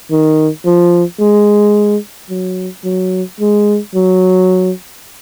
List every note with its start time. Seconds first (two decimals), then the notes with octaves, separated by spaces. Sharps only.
0.11 D#3
0.65 F3
1.20 G#3
2.30 F#3
2.84 F#3
3.40 G#3
3.95 F#3